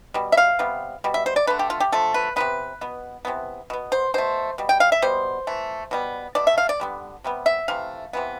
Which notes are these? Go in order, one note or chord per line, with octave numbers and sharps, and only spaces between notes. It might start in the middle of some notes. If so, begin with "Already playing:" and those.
B2 G3
E5
F5
C3 G3 B3
B2 G3
E5
C5
D5
D3 A3 B4
G4
F4
G4
D3 F3 A3 A4
B4
C3 F3 B3 B4
B2 B3
C3 E3 B3
B2 B3
C5
B2 A3 C5
B2 G3
G5
F5
E5
B2 G3 B3 C5
E3 A3
B2 G3 B3
B2 A3 D5
E5
F5
D5
D3 G3 B3
C3 G3 B3
E5
C3 E3 A3 F5
C3 E3 B3